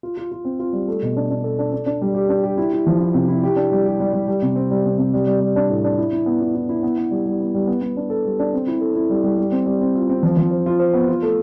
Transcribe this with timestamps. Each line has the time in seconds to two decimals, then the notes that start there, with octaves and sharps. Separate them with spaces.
0.03 F4
0.17 F4
0.32 F4
0.45 C4
0.60 F4
0.73 G3
0.88 A3
1.02 B2
1.16 D4
1.31 D4
1.44 A4
1.59 D4
1.73 D4
1.86 D4
2.01 G3
2.15 G4
2.29 D4
2.43 G4
2.57 E4
2.72 E4
2.86 F3
3.01 E4
3.14 C3
3.28 E4
3.43 G4
3.56 D4
3.72 G3
3.86 G4
4.00 G3
4.13 G3
4.28 G3
4.42 C3
4.56 C4
4.71 G3
4.85 C3
4.98 C3
5.13 G3
5.27 G3
5.41 G3
5.56 D4
5.69 A2
5.84 D4
5.97 E4
6.13 E4
6.26 B3
6.41 E4
6.55 E4
6.69 E4
6.83 B3
6.98 B3
7.11 G3
7.26 G3
7.40 B3
7.54 G3
7.67 B3
7.82 B3
7.97 D4
8.10 A4
8.25 G3
8.39 D4
8.53 C4
8.67 E4
8.81 A4
8.95 E4
9.10 G3
9.24 G3
9.38 G3
9.52 C4
9.66 G3
9.81 C4
9.95 F4
10.09 C4
10.23 F3
10.37 F3
10.51 C5
10.66 F4
10.79 C5
10.93 B3
11.09 F4
11.23 A3